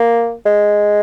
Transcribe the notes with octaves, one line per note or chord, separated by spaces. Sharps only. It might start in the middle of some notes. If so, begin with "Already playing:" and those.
Already playing: A#3
G#3